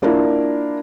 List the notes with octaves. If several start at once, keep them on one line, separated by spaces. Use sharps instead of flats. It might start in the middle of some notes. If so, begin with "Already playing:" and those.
A#3 D4 E4 F4 A#4